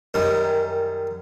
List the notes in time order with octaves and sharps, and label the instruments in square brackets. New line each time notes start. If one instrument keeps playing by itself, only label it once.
[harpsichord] F#2 D#3 G3